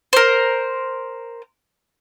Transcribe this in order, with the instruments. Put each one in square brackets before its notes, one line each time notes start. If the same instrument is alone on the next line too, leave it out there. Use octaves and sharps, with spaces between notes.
[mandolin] A#4 C5